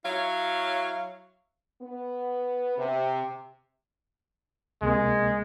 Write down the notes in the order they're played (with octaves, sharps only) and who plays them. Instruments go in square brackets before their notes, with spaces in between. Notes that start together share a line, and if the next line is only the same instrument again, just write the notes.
[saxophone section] F#3 E4 C#5 F5
[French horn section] B3
C3
[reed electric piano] C#2 C3 A#3 [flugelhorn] G#3